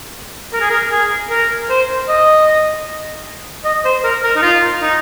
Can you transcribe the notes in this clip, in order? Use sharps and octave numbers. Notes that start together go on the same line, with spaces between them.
A#4
G#4
A#4
G#4
A#4
C5
D#5
D#5
C5
A#4
A#4
D#4
F4
D#4